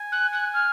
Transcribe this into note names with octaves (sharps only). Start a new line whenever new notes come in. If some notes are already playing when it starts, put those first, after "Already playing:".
Already playing: G#5
F#6
F#6
F6